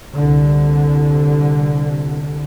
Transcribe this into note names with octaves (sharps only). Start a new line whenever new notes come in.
C2 D3